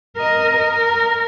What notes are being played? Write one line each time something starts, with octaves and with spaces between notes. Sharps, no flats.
A#4 D#5
A#4